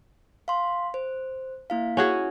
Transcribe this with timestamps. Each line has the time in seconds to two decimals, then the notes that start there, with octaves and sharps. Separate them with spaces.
0.48 F5 C6
0.94 C5
1.70 A#3 E4 F5
1.97 C#4 E4 F#4 G#4